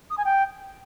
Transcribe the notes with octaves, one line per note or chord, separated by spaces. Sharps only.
D#6
G#5
G5